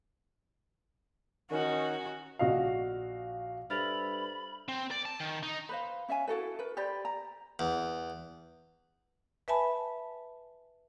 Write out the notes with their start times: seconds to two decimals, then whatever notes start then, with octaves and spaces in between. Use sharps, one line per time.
1.51 D#3 C#4 D#4 F#4
2.39 A#1 F#4 D#5 F5
3.70 G2 A4 C5 E5 B5 F6 A6 F7
4.68 C4
4.91 D5
5.06 A5
5.20 D#3
5.43 D#4
5.69 B4 C5 F5
6.08 C#4 E5 F5 G#5
6.27 E4 F#4 A4 B4
6.59 A#4 B4
6.77 G4 C5 D5 B5
7.05 A#5
7.59 E2
9.48 B4 E5 G#5 A5 B5